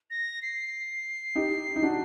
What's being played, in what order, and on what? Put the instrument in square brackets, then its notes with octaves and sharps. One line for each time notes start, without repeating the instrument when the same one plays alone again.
[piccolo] A#6
C7
[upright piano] D#4 G4
D#4
D4 F#4